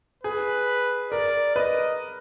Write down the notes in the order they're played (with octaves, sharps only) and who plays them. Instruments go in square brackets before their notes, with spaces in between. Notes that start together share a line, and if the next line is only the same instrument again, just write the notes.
[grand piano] G#4 [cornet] B4
[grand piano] A#4 [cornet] D5
[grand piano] B4 [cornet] D#5